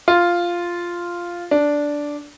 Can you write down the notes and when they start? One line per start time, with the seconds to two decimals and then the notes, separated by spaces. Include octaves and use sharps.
0.08 F4
1.51 D4